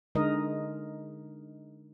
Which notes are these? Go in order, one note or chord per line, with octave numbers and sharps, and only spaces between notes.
D3 G#3 D#4 A#4 D#5